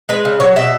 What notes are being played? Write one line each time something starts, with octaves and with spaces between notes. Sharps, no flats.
G#3 B4
C#3
F#3 C#5
B2 E5